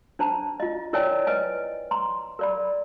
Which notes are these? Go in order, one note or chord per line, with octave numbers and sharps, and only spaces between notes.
D4 C5 A5 A#5
F4 D#5
E4 A#4 C#5 D5 G5 G#5
B4 D#5 G#5
A#5 C6
A#4 D5 B5